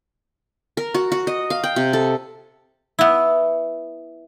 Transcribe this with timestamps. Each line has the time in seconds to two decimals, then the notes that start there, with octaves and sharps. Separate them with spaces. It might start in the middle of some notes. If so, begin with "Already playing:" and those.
0.77 A#4
0.94 F#4
1.12 F#4
1.27 D#5
1.50 F5
1.64 G5
1.76 C3
1.93 A4
2.99 B3 E4